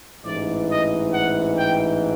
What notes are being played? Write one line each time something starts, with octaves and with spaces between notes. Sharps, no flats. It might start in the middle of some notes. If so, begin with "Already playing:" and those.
A1 G#2 E3 D5
D#5
F#5
G5